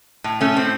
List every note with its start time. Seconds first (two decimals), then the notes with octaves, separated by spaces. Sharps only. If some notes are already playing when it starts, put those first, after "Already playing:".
0.24 A2
0.41 A3 C#4
0.56 A2 C4